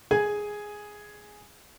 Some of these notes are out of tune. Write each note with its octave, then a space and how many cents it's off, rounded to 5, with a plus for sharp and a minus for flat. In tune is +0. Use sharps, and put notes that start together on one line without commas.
G#4 +0 G#5 +0